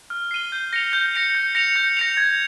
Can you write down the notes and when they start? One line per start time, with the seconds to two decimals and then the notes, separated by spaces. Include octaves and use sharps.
0.10 F6
0.31 C7 D#7 G7
0.52 G6
0.73 A#6 C#7 F7
0.93 G6
1.14 A#6 C#7 F7
1.35 G6
1.55 A#6 C#7 F7
1.76 G6
1.97 A#6 C#7 F7
2.17 G#6